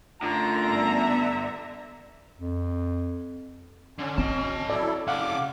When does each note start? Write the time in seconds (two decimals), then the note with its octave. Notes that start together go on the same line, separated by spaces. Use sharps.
0.23 F#2 D3 A3 F4 A#5
0.65 G2 B3 E5
2.38 F2
3.99 D3 C#4
4.18 C4 D#5 A5
4.70 F#3 E4 A4 D5
5.08 C#3 F5 F#5 D6